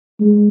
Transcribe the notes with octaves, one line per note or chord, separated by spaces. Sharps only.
G#3